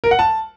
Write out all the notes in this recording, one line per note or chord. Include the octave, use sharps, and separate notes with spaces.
A#4
F#5
A5